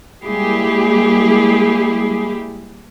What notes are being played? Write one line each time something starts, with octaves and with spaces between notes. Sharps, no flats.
G3 G#3 A#3 E4 G4 G#4